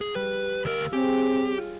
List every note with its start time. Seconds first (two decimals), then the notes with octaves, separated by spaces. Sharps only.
0.01 G#4
0.15 G3 B4
0.65 D2 A#4 D#5 F5 E6
0.93 C4 G4 G#4 C#5 G5
1.58 F4